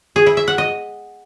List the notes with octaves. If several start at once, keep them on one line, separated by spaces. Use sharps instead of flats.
G#4
E4
E5
F#5
D#5